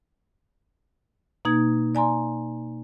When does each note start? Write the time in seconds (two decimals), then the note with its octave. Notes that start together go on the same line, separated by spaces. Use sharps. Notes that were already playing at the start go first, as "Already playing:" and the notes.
1.45 B2 A#3 D#4 G#6
1.95 D5 G#5 A#5 C6